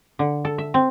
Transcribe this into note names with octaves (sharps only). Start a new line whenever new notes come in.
D3
A4
E5
C4